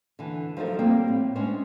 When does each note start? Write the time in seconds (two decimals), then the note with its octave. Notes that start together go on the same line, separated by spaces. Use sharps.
0.19 D3 E3
0.57 F3 F#3 D#4 A4 A#4
0.79 G3 A#3 C4
1.08 A2
1.36 G#3 C#4 D4 C5